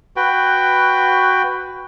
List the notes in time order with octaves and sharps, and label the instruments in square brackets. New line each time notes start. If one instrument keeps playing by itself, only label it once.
[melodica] F#4 B4 G5